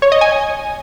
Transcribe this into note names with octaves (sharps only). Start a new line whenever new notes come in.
C#5
D#5
G#5